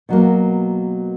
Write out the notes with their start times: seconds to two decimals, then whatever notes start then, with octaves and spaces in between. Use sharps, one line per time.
0.09 B2 F#3 A#3